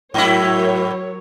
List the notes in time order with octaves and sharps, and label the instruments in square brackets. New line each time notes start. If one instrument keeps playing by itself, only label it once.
[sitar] G#2 E4 [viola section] F#3 A#4 C#5